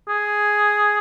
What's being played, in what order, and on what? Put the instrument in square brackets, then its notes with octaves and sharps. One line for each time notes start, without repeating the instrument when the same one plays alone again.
[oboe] G#4